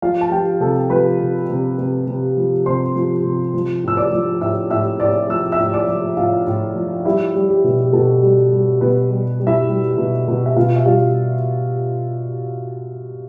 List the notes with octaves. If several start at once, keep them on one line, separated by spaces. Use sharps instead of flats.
F3 F4 F5
A5
F3 G4 G5
C3 A4 A5
F3 B4 B5
C3
C3
C3
C3
F3
C3 C5 C6
F3
C3
F3
A2 E6
D5 D6
F3
A2 E5 E6
A2 E5 E6
A2 D5 D6
F3 E6
E5 E6
A2
D5 D6
F3
A2 F4 F5
A2
F3
G3 E4 E5
G3
G4
B2
G4
B2 A4
G3
G3
B2 B3 B4
G3
G3
E4 E5
G3
B2
B2
E5
B2 F4 F5
E5
G3 F4 F5